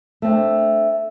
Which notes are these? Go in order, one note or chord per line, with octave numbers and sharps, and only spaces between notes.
A3 C4 D4